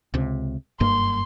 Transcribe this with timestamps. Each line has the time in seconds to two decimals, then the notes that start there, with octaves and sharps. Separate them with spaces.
0.14 C#2 C3
0.80 F#1 G2 A#3 C6